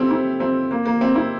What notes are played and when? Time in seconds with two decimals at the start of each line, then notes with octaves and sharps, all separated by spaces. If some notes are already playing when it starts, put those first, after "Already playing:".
Already playing: C4 E4 G4 A4
0.10 C4 E4
0.40 C4
0.71 A#3
0.86 A#3
1.01 C4
1.16 C4 E4